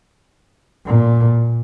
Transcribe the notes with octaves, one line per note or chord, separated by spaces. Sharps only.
A#2